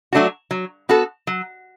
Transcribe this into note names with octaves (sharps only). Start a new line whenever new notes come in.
F#3 A3 D4 F#4
F#3
B3 F#4 A4
F#3